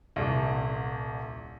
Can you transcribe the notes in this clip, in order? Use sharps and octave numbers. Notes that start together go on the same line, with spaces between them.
D#1 C2